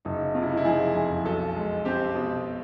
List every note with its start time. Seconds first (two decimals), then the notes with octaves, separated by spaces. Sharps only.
0.05 F#1 D#4
0.35 C3 F4
0.43 E4
0.49 D#4
0.57 E4
0.65 F3 G#4
0.95 F2 G#4
1.25 B1 A4
1.55 G#3
1.85 C4 G4
2.15 B2